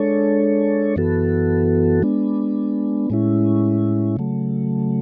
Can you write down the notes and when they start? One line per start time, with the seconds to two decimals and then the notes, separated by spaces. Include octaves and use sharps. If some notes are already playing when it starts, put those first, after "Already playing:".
Already playing: G#3 D4 A4 C#5
0.96 F#2 E3 B3 F#4 A4
2.02 G#3 B3 D4
3.10 A2 G#3 C#4 E4
4.16 C#3 F#3 A3